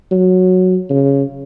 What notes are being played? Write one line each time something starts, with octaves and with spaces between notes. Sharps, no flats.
F#3
C#3